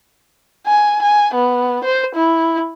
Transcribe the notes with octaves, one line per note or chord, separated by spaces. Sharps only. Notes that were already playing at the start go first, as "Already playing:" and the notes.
G#5
G#5
B3
C5
E4